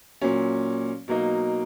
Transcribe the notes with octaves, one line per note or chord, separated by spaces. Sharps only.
A#2 F#3 C#4
B2 F#3 A#3 D#4